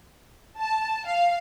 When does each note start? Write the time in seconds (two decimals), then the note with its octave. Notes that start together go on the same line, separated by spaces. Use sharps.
0.59 A5
1.06 F5